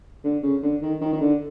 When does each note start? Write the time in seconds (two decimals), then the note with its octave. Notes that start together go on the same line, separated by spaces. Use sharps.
0.24 D3
0.42 C#3
0.63 D3
0.82 D#3
1.01 D#3
1.13 D#3
1.21 D3